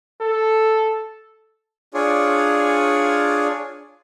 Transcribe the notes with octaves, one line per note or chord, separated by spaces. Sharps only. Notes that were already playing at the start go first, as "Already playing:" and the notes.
A4
D4 F4 G#4 C#5 D5